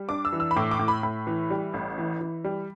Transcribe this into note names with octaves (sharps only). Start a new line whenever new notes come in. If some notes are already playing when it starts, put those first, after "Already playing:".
Already playing: G3
D4 D6
E6
E3
E6
B5
A2 D6
D6
A2
B5
A2 B5
E3
G3
A1
E3
E3
G3